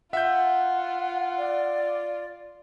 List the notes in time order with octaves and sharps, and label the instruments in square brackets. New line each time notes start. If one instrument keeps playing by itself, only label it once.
[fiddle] F4 [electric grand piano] E5 G6 [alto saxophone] F#5
[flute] D5